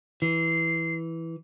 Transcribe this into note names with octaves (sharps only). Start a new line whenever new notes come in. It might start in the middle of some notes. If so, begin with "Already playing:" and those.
E3 C7